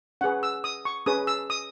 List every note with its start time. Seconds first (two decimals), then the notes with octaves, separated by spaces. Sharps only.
0.21 C#4 G#4 B4 F#5
0.43 E6
0.64 D#6
0.85 C#6
1.06 C#4 G#4 B4 D#6
1.27 E6
1.50 D#6